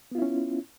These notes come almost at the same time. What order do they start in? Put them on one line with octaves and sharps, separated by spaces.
B3 F4 E4 C#4